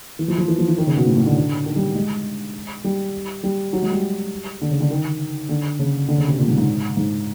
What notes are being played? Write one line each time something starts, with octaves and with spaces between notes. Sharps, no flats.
E3
F3
F3
E3
F3
E3
D#3
C#3
B2
A2
A2
D3
D3
D#3
G3
G#3
G3
G3
F#3
G#3
G3
D3
C#3
D3
D#3
D3
C#3
D3
C#3
C3
A#2
G#2
G#2
G#2